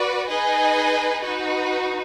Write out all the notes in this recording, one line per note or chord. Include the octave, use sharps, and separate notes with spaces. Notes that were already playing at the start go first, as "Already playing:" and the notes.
Already playing: F#4 B4 D5
D#4 G#4 B4 D#5 G#5
D#4 F#4 B4